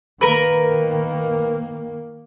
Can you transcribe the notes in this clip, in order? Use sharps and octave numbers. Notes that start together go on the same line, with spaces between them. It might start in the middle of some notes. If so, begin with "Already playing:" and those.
D#3 A#3 A#4 B4